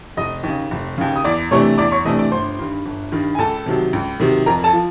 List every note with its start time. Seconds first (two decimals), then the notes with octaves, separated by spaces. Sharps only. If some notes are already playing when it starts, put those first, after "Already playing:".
0.17 F1 D#5 D#6
0.43 D#2 C#3
0.71 F1
0.98 D#2 C#3
1.16 D#6
1.24 E2 D5 D6
1.51 C3 E3 A3 D4 C#5 C#6
1.78 E2 D5 D6
1.92 C#5 C#6
2.05 C3 E3 A3 D4 D#5 D#6
2.19 D5 D6
2.31 G1 C5 C6
2.59 G2 D#3
2.85 G1
3.12 G2 D#3
3.35 G#5
3.39 C#2 A4 A5
3.66 C3 D#3 F#3
3.93 C#2
4.20 C3 D#3 F#3
4.46 F2 A#4 A#5
4.64 A4 A5
4.73 F3